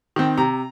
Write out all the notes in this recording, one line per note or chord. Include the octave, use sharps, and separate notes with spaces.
D#3 C4
C3 A#5